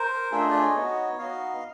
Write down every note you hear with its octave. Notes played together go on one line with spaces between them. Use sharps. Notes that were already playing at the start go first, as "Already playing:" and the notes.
Already playing: A#4 C5
A3 D4 F4 G#4 E5
D#5
D5
C#5 D#5
B3 D#4 F#4
B3 D#4 F#4 D#5 F5